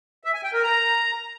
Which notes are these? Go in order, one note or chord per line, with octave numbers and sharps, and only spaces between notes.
E5
G#5
G5
A#4
A#5